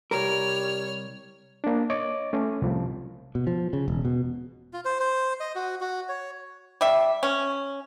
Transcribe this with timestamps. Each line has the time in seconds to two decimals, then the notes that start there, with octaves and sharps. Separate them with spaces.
0.11 C2 G3 A#4 C#5 F6
1.64 A#3 D4
1.90 C#5 D#5 D6
2.33 A3 C#4
2.62 C2 F3
3.35 B2
3.47 F3
3.73 C#3
3.88 E1
4.05 B2
4.73 F4
4.85 C5
5.00 C5
5.40 D#5
5.55 F#4
5.81 F#4
6.09 C#5
6.81 G3 E5
7.23 C#4